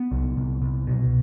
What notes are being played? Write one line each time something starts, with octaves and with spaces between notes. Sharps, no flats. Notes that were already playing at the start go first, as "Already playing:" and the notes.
Already playing: B3
C2
C2
C2
B2